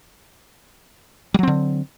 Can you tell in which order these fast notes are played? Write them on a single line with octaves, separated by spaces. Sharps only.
G3 F#3 C4 D3